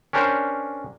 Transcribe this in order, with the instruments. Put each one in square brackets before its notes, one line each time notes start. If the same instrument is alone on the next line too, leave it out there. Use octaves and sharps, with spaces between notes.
[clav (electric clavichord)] C#4 D4 G4 A#4 C5